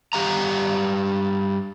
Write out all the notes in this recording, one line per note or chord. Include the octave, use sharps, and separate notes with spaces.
G2 A3 G4 F5 A#5